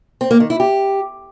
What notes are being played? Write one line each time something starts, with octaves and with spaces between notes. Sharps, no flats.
C4
A#3
D#3
E4
G4